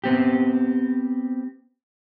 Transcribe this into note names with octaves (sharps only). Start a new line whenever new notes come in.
B3 C4 G4